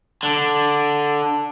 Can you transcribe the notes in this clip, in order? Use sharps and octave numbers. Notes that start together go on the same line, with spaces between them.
D3